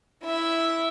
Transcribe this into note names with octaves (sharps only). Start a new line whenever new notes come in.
E4 E5